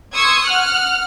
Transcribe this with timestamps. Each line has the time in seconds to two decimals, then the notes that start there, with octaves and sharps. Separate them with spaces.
0.14 C6 C#6 D#6 E6 G#6 C#7
0.46 F#5 F6 F#6